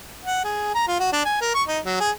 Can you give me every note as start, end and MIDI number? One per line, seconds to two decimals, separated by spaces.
0.24 0.41 78
0.44 0.71 68
0.75 0.83 82
0.88 0.99 65
1.00 1.08 66
1.12 1.22 62
1.25 1.36 80
1.41 1.54 70
1.54 1.62 85
1.68 1.79 63
1.85 1.98 54
2.00 2.10 68